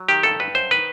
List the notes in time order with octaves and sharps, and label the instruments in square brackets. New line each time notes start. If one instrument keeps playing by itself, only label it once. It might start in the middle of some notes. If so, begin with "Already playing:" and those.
Already playing: [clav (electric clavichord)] F#3
D#3 G4
G2 A4
G2 B4
F#2 C5
D#3 B4